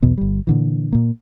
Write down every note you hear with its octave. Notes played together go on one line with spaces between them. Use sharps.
B1 E2 B2 B3
G1 G3
A#2 D3 E3
A#2 A#3